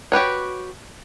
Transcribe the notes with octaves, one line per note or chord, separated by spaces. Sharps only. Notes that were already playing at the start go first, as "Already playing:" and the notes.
F#4 G4 B4 C#5